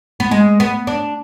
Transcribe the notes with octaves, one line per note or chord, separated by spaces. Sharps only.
B3
G#3
B3
D4